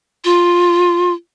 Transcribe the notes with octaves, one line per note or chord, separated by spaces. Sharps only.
F4